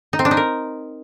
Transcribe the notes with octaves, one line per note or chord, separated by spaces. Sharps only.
D#4
C4
D4
D#4
A#4